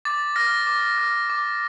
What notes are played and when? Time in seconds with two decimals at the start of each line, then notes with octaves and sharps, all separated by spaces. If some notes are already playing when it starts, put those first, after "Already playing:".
0.05 D6 A6
0.36 F6 A#6
0.67 D6
0.98 F6
1.30 D6